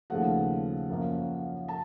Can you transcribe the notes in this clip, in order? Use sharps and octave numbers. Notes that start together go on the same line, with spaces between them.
D#2 C#3 F3 A3 F#5
F#2 F3 A#3 C#4
A5